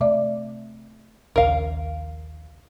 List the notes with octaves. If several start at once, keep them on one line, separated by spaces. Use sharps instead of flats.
C3 A3 D5 E5 D6
A#1 D#2 C#3 A#4 F5